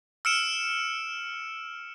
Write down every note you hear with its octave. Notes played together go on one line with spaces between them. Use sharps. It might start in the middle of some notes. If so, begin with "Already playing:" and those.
E6 F6 C#7 D7 E7